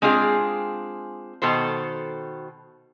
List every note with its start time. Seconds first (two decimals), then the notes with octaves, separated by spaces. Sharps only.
0.02 G#3 C4 D4 F4 G#4 F5
1.42 B2 D#3 A4 C5